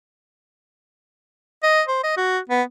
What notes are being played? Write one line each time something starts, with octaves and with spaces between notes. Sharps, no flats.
D#5
C5
D#5
F#4
B3